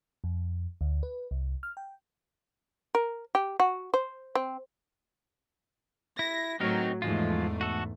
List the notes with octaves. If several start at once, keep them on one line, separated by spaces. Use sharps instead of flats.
F2
D2
B4
C2
F6
G5
A#4
G4
F#4
C5
C4
E4 A#6
A2 F#3 C4 D#4 A#4
E2 G#2 F3 G#3 A3 F4
F#4 A4